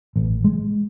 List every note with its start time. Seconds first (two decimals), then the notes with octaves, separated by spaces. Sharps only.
0.16 A1
0.44 G#3